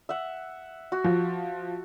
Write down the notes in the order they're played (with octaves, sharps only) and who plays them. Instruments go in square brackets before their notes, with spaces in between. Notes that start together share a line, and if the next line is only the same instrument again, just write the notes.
[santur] E5 F#5
F#4
[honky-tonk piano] F3